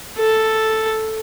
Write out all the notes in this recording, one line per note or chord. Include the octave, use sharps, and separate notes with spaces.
A4